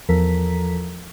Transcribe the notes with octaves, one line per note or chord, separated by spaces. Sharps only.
E2 F3 A4 A#4 A#5 B6